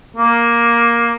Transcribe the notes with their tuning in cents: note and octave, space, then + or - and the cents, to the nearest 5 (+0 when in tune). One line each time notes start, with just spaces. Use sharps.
A#3 +10